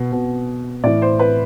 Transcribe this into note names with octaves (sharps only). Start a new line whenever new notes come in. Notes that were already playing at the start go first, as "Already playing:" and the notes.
Already playing: B2
B2
A2 E3 D5
C5
B4